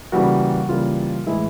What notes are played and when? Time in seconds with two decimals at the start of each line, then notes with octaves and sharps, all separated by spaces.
0.12 C#3 E3 G3 A#3 F#4
0.69 C#3 E3 G3 A#3 F4
1.27 A2 E3 G#3 E4